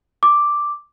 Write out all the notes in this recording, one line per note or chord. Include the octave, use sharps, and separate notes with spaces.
D6